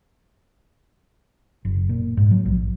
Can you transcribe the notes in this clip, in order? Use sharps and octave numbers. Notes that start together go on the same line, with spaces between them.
F#1
A#2
G#2
F#3
A#1